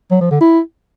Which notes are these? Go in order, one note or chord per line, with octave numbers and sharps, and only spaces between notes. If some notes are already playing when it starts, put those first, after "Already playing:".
F#3
F3
D3
E4